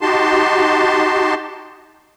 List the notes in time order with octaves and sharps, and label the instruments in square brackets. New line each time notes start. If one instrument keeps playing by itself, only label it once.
[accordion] D#4 F#4 G4 A5 C6